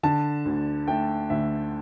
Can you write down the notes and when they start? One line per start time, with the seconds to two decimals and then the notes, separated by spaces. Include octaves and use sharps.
0.03 D3 A5
0.45 D2
0.88 A3 G5
1.30 D2 E5